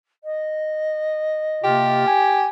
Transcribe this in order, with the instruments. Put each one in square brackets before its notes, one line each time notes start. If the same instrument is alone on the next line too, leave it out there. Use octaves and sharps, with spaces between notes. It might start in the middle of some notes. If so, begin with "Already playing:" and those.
[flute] D#5
[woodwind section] C3 A#3 F4 [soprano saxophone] G4
[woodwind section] G#5